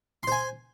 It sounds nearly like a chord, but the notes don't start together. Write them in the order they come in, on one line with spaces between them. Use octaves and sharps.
C6 C5 G#5